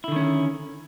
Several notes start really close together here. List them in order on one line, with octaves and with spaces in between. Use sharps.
E4 D3 D#3 C#4